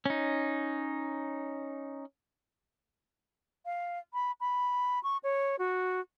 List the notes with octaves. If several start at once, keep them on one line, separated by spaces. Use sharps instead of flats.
C#4 D#4
F5
B5
B5
C#6
C#5
F#4